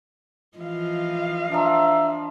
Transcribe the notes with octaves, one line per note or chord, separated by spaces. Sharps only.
E3 F3 F4 D#5 F5
F3 D4 E5 A#5